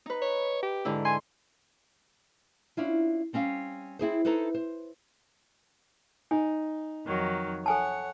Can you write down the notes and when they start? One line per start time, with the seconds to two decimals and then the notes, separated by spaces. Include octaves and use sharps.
0.06 D#4 B4
0.22 C#5
0.63 G4
0.85 G#2 D3 E4
1.05 G#5 C6
2.77 C#4 D4 E4 F4
3.33 G3 C4 C#4 F5
3.99 C4 E4 G#4 C5
4.25 D#4 E4 A4 B4 C5
4.54 C5
6.31 D#4 G#5
7.05 F2 D#3 F#3
7.66 A4 C#5 F#5 G#5 A5